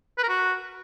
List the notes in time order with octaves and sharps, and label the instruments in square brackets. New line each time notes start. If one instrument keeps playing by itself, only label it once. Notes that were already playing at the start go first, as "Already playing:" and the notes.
[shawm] B4
A#4
F#4